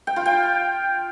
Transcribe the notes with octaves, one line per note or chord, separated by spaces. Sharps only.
G5
F4
G5